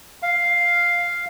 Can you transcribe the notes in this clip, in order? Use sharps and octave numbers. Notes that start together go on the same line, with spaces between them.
F5